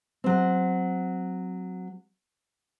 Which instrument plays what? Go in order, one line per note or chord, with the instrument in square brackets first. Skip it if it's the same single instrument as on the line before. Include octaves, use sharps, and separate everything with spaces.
[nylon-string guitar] F#3 C4